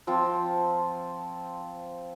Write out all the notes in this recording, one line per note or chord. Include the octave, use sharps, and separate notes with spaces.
F3 C4 A5